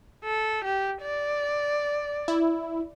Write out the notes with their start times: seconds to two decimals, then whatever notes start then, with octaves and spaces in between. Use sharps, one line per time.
0.24 A4
0.64 G4
1.02 D5
2.28 E4